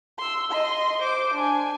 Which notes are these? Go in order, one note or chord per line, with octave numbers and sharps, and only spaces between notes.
C6 E6
D#5 C6
C5 D6
D4 G#5